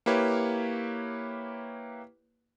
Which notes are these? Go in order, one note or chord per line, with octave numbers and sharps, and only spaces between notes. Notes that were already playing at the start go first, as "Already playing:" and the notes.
A#3 E4 G4 B4 C#5